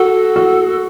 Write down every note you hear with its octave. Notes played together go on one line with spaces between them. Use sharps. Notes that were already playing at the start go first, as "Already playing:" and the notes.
Already playing: F#4 A4
F#4